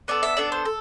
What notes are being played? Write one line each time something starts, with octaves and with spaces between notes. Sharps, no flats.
B3 D4 A4 D5
E5
B3 D4 A4 D5
C5
A4